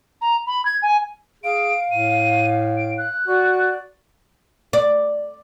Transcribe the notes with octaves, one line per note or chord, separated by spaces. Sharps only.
A#5
B5
G#6
G#5
G#4 F5 D7
A2 D#7
D7
F#6
F#4 D5
D5